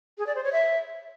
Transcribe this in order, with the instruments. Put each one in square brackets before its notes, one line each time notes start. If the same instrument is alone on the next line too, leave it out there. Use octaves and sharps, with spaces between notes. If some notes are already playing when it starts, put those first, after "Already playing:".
[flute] G#4
D5
C5
C#5
E5